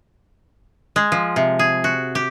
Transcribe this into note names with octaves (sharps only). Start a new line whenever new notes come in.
G#3
F3
C3
G#4
F#4
G4